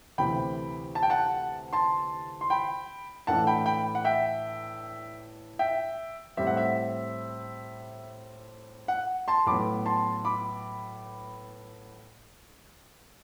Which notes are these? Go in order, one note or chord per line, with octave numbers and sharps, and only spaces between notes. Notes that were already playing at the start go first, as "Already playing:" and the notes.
D2 C3 E3 G5 B5
A5
G5
F#5 A5
A5 C6
C6
G5 B5
A2 E3 A3 D4 F#5 A5
G5 B5
G5 B5
F#5
E5 G5
E5 G5
A2 G3 C4 E5
F#5
E5
F#5
A5 C6
A2 F#3 B3 B5 D6
A5 C6
B5 D6